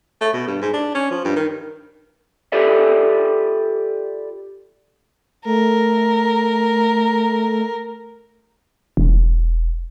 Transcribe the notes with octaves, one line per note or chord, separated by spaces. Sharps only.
A3
B2
G2
G#2
D4
C#4
F3
G2
D#3
F4 G4 A4 B4 D5 E5
A3 A#4
E1